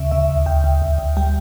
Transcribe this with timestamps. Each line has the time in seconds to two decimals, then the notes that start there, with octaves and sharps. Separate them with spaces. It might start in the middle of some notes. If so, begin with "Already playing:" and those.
Already playing: D2 C#3 E5
0.12 C#3 E5
0.29 D2
0.46 D2 G5
0.64 D2
0.82 D2
0.98 D2
1.17 G3 G5